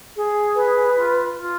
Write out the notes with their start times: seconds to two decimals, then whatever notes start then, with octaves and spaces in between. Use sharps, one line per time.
0.14 G#4
0.55 B4
0.96 F4
1.36 F4